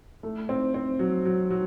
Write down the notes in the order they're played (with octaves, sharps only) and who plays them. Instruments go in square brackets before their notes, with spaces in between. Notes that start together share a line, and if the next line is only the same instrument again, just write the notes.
[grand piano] A3
C4
C4
F#3
F#3
F#3